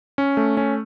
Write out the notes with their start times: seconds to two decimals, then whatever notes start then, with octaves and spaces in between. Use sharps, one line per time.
0.18 C#4
0.37 A3
0.57 C#4